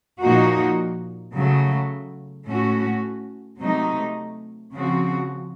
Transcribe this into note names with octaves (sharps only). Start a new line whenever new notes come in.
A#2 F3 A#3 D#4 F#4
C#3 F#3 A3
A2 A3 C#4 F#4
C3 F#3 A3 D#4
C#3 F3 C4 F#4